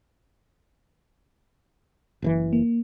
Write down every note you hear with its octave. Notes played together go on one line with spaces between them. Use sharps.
F#1 C3 E3
A#3